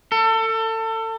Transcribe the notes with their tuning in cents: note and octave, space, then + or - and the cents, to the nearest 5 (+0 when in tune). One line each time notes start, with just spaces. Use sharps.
A4 +30